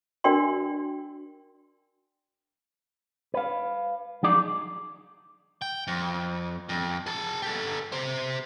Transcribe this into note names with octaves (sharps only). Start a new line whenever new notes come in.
D4 F#4 A#4 D5 G5 C6
B4 F5
F3 F#3 D#4 G#4 D5
G5
F2
F2
G#4 A5
G4 A4
G4 C5